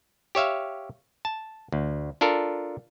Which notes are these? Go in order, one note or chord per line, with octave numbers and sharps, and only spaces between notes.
G4 C#5 E5 F5
A5
D2
D4 F4 A4 A#4